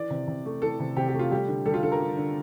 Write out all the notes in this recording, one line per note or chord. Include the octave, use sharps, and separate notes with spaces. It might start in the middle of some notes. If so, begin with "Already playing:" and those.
Already playing: E3 D5
C3
C3
A3
E3 A4
C3
C3 G4
G4
A3
F4
G3 G4
D3
G3 A4
F4
D3 A4
A#4
G3
D3